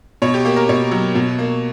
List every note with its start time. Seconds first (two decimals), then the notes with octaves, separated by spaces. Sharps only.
0.22 B2 C#5
0.34 G4
0.45 A#3 G4
0.56 A#4
0.69 B2 C#5
0.91 F#3
1.15 B2
1.39 A#3